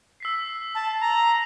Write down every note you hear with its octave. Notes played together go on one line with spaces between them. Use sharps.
E6 B6 C7
A5
A#5